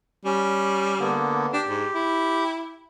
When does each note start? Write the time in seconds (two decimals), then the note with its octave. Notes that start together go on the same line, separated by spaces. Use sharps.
0.25 G3 C#4
1.00 D3 A#3 B3
1.53 D4 G4
1.67 G#2
1.94 E4